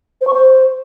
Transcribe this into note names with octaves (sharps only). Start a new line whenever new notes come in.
C5
C#6
C5